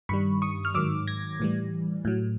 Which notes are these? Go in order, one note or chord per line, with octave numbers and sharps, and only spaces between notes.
G2 D#3 G3 B5 C#6
C#6 D#6
F6
G#2 D#3 F#3 D6 E6
G#6 A#6
A2 E3 G3
A2 F#3